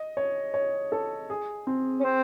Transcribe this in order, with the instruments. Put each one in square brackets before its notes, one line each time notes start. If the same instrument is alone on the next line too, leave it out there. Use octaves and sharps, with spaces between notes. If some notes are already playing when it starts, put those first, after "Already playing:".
Already playing: [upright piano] D#5
C#5
C#5
A4
G#4
C4
[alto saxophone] C#4
C4